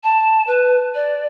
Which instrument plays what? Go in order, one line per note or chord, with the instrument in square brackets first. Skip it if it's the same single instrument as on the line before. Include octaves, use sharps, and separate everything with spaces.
[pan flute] A5
B4
D5